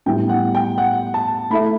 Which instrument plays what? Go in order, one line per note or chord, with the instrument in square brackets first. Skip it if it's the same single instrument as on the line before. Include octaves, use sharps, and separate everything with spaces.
[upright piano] A2 G3 B3 E4 [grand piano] G5
[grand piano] F#5
G5
F#5
A5
[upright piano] A3 E4 A4 E5 [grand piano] B5